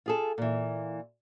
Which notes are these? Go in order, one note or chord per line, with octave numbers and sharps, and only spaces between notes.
F4 G#4 A4
A#2 E3